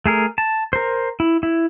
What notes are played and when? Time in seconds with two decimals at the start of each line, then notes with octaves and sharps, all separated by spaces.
0.06 A3 G#4 A#4
0.38 A5
0.73 A#4 C5
1.20 E4
1.43 E4